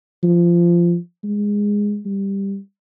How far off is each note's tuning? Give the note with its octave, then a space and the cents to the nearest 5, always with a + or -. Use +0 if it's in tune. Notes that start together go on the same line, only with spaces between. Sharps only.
F3 -15
G#3 -10
G3 +10